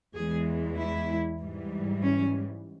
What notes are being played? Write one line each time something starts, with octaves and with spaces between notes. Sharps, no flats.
E2 E3 G#3 G#4
E4
G#2 E3 G3
C#4